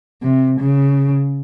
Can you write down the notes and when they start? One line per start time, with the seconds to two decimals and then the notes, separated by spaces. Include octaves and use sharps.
0.23 C3
0.60 C#3